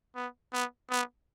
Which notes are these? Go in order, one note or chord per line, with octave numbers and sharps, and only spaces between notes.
B3
B3
B3